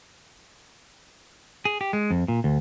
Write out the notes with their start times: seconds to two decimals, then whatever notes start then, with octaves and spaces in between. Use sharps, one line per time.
1.65 G#4
1.81 G4
1.93 G#3
2.10 F2
2.28 A#2
2.44 D2